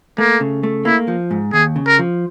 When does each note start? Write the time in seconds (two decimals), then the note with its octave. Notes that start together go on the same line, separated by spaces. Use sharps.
0.18 A3 A#3
0.41 C#3
0.63 A3
0.85 A#3 E4
1.08 F3
1.31 G#2
1.53 D#2 G#4
1.76 C#3
1.87 A#4
1.99 F3